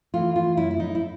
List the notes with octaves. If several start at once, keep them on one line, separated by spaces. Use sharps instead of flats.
E3 A3 F4
F4
F#2 E4
E4
D#4
E4